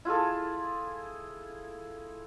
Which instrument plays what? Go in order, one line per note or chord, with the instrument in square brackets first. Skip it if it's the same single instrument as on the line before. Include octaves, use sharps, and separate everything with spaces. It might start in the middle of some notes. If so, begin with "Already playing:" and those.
[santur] E4 F4 G#4 A4